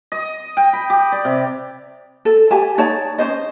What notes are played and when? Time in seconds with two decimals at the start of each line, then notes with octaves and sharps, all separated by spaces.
0.12 D#5
0.57 G5
0.73 B5
0.90 G4
1.12 D5
1.25 C3
2.25 A4
2.51 G4 G#5 A5
2.78 D#4 C#5 D5 A5
3.18 C#4 D4 C5 D#5